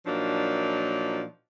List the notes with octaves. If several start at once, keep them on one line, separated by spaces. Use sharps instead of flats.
A#2 F3 F#3 A#3 D4 D#4